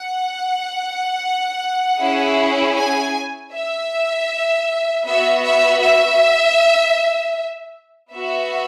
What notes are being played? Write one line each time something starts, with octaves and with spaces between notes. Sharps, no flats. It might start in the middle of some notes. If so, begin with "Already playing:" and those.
Already playing: F#5
C#4 E4 G#4
G#5
E5
B3 F#4 E5
E5
E5
B3 F#4 E5